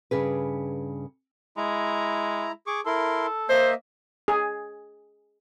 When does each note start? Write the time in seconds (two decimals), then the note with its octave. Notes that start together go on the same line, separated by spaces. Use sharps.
0.11 G2 C#3 G#4 B4
1.57 G#3 E4 A#5
2.67 G#4 C#6 D6
2.86 E4 A4 A#4 C6
3.49 A#3 C5 D#5 E5
4.28 G#4